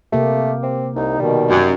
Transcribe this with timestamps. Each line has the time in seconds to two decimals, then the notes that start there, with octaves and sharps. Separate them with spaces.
0.13 C3 A3 A#3 G4
0.63 C4
0.96 C2 D#4
1.19 B2 D#3 G3
1.50 F#2 D#4 F#4